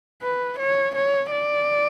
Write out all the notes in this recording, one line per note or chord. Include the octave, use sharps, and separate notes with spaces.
B4
C#5
C#5
D5